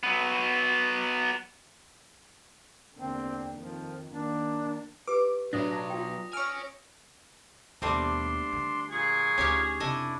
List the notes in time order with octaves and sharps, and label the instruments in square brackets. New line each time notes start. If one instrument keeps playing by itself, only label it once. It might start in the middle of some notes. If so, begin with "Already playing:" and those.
[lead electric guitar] F#3 B3
[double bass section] E2 D3 A#3 [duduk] C4
[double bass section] F2 D#3 [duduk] F3
[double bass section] D#3 A#3 [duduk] D4
[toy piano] G4 B4 [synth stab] D6
[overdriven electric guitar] B1 F#3 [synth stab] A2 D4 [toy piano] C#5 D5 [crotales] D#6 A#6
[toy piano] D5 A5 A#5 [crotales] A#6
[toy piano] F4 G5
[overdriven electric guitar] C#5 G#5 [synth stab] C#6 F6 [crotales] E6 D7
[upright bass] D#2 B2 [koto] G3 A3 C4 [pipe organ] D4 C6
[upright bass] D3
[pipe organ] A#2 C#6 [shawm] G#4
[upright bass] D2 D#4 [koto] C#4 G4 C#5
[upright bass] F1 C3 [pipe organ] D4 E4 [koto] A4 D#5 G#5